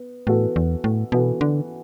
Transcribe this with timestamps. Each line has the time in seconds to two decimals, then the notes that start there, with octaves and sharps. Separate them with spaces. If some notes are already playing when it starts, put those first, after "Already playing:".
Already playing: B3
0.27 A2 E3 B3 F#4 A4
0.56 E2
0.84 A2
1.12 B2 E3 B3 F#4 A4
1.41 D3